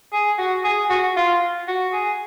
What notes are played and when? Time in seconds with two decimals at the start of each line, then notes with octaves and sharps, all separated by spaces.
0.12 G#4
0.38 F#4
0.64 G#4
0.89 F#4
1.16 F4
1.68 F#4
1.93 G#4